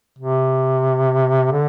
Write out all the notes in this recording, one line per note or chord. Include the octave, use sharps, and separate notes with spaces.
C3
D3